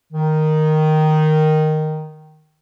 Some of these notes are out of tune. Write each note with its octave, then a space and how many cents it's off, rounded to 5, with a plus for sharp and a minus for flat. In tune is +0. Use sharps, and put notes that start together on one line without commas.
D#3 -5